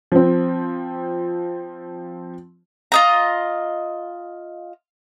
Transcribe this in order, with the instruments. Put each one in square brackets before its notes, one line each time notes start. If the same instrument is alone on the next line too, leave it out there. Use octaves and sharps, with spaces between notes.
[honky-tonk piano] F3 C4
[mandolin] F4 D#5 A#5